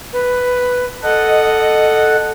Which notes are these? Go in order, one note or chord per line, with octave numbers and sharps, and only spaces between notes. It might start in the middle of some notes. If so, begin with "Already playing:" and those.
B4
A4 D#5 F#5